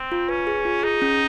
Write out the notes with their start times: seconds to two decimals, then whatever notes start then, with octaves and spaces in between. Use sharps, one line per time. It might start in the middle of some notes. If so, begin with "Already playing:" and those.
Already playing: C4
0.12 F4
0.29 C#4 B4
0.47 G#4
0.65 F4
0.83 D#4 G#4
1.02 C#4